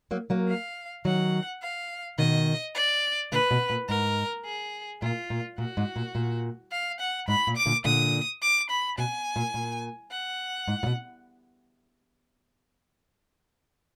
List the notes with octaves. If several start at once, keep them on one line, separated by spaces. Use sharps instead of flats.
F#3 A#3
F#3 A#3
F5
D#3 F#3 F#5
F5
B2 D#3 D#5
D5
A#2 D3 B4
B2
A#2
G#2 A#4
G#4
A#2 F4
A#2
A#2 F#4
G#2
A#2
A#2
F5
F#5
G#2 B5
A#2
D6
A#2 D3
A#2 D3 D#6
D6
B5
B2 G#5
A#2
A#2
F#5
G#2
A#2
B2